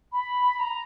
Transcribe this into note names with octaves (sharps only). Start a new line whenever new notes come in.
B5
A#5